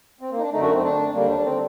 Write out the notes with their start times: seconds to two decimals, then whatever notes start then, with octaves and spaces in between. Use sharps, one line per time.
0.21 C4
0.31 A#3
0.37 D#4
0.41 D4
0.51 F#2 D3 A3 D#4
0.61 F#4
0.73 C4
0.83 D4
1.13 D#2 D3 G3 A#3
1.29 D4
1.45 C4